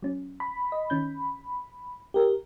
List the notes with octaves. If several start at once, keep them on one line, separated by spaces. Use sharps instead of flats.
F#3 C#4
B5
D#5
D#3 C#4 G6
G4 A#4